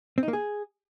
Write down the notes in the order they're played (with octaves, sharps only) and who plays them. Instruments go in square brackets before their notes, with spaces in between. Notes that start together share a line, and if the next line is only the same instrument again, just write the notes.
[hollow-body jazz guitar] C4
D#4
A#3
G#4